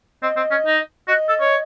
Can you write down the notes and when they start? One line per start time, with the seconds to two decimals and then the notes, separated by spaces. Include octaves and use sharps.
0.22 C4 D#5
0.36 C4
0.51 C#4
0.66 D#4
1.08 F#4 D#5
1.29 A4
1.40 C#5